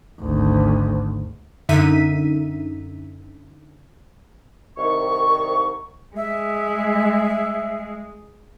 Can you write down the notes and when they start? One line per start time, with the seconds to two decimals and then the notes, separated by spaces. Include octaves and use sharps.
0.20 G#1 D2
1.69 F#2 D3 D#4 E5 B6 D#7
4.77 C2 D#3 C#6
6.16 G#3 E5